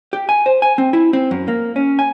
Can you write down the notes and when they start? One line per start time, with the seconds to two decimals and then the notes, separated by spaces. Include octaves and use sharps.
0.13 G4
0.29 G#5
0.46 C5
0.62 G#5
0.78 C4
0.93 E4
1.13 C4
1.31 F#2
1.48 A#3
1.76 C#4
1.99 G#5